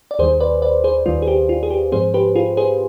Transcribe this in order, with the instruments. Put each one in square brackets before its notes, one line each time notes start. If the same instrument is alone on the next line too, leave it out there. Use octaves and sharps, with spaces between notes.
[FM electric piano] D5
D#2 D#3 G3 G#4 C5
B4 D5
B4 D5
G#4 C5
D#2 D#3 G3 F4
G#4
G4
F4
G#4
G4
G#2 F3 C4 G#4 C5
G4 B4
F4 G#4
G#4 C5